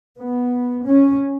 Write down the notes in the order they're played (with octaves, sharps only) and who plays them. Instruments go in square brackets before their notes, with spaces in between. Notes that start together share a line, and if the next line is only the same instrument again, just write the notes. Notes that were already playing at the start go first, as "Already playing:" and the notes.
[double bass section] B3
C#4